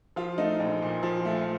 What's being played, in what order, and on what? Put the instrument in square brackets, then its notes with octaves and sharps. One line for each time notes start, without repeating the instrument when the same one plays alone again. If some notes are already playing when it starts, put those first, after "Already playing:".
[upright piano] F3 F4
A3 D#4
A#1
A#2
F3
A3